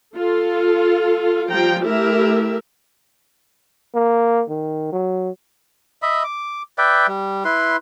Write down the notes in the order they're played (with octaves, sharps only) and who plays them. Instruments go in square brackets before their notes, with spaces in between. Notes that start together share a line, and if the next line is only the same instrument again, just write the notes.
[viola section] F4 A4
F3 G3 F4 G5 A#5
A3 E4 G4 A#4 E5
[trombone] A#3
D#3
F#3
[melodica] D#5 E5 B5
D6
B4 D5 E5 G5
G3
E4 B4 C6